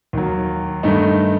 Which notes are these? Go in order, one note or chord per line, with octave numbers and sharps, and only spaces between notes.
D#2 D#3 F#3
G2 D#3 A3 D#4